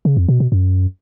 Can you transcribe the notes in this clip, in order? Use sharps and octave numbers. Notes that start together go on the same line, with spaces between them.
C#3
F2
B2
B2
F#2